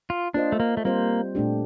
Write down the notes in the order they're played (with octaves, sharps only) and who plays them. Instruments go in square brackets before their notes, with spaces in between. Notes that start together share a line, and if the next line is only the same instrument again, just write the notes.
[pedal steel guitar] F4
[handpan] A#3 F4 C5 D#5 [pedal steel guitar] D4
[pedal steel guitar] A3
A#3
A3
[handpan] G3 C4 F4 C5 [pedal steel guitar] A#3
[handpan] A#2 A3 D4 G4